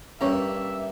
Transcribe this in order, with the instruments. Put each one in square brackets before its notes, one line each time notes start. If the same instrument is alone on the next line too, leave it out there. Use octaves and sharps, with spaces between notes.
[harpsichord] G2 A#3 [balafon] C#4 C#5 C#6 [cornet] E5